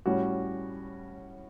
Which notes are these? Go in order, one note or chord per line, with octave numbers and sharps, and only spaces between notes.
A2 G3 C#4 F#4